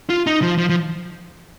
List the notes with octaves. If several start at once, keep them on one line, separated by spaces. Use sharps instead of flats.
F4
D#4
F3
F3
F3